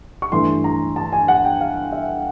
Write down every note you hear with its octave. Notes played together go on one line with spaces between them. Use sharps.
C#6
G2 E3 A3 C6
A#5
A5
G#5
F#5
G5
F5
E5